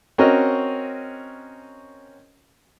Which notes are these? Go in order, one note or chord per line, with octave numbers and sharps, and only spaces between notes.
C4 C#4 F#4 A#4 D#5